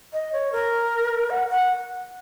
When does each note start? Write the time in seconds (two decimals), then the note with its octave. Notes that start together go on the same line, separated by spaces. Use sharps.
0.13 D#5
0.33 C#5
0.52 A#4
1.30 F#5
1.50 F#5